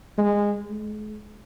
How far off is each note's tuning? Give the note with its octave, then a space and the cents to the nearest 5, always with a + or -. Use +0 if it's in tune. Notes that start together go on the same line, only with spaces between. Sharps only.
G#3 -20
G#3 +40